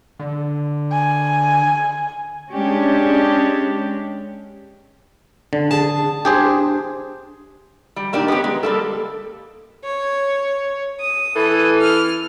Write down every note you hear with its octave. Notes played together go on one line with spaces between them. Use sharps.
D3
G#5
G#3 C#4 D4 G4
D3
G#4 A5
D4 G4 G#4 C5
G3
A#2 A#3 D4 D#4 G4
B3 C#4 G4
G#3
G3 A#3 A4
C#5
D#6
E3 A4
F6